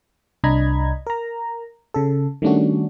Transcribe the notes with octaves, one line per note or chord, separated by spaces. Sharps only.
C2 D4 D#5 A#5 B5 G#6
A#4 A#5
C#3 A4
D#3 G3 A3 C#4 D4 F#4